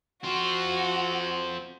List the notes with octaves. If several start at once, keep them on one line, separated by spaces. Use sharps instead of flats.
C4 F4 F#4